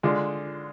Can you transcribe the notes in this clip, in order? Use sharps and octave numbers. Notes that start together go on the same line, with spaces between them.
D3 G#3 D4 F4